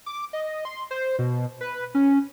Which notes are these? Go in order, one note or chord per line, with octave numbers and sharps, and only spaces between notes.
D6
D#5
C6
C5
B2
B4
C#4